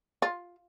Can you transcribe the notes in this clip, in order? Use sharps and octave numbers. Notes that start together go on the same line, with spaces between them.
F4